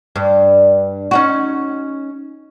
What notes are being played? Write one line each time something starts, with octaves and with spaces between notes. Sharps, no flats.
G2
C#4 D#4 F#4